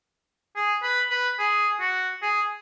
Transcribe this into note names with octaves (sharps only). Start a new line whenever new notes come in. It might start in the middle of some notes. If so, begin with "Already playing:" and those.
G#4
B4
B4
G#4
F#4
G#4